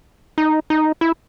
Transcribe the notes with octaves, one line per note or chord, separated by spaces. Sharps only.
D#4
D#4
E4